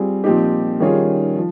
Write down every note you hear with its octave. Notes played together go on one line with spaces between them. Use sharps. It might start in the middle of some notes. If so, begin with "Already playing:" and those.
Already playing: G3 C4 F4 G#4
A#2 F3 C4 D#4 G4
D#3 G3 C#4 F4 G#4
F3